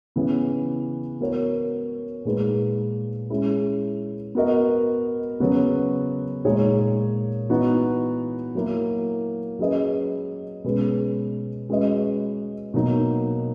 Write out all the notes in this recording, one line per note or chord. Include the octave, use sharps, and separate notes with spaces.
C#3 E3 B3
B3 F#4 A#4 C#5
A#2 G#3 D#4 G#4 B4
G#3 C#4 E4 G#4
B3 F#4 A#4 D#5
C#3 F#3 B3 F#4
A#2 G#3 D#4 G#4 C#5
E3 B3 D#4 F#4
F#3 A#3 E4
F#3 C#4 G#4 B4 D#5
B2 G#3 C#4 G#4 B4
G#3 C#4 F#4 B4 D#5
B2 F#3 A#3 D#4